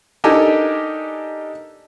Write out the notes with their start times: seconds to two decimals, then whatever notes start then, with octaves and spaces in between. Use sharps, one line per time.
0.24 D4 D#4 G4 A4 A#4 G#5